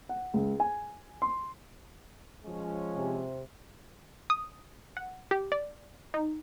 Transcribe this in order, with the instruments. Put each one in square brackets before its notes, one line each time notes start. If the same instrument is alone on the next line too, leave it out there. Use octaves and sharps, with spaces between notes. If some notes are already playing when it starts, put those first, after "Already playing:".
[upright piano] F#5
C#2
G#5
C6
[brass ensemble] F3 G#3 C#4
[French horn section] C3
[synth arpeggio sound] D#6
F#5
G4
D5
D#4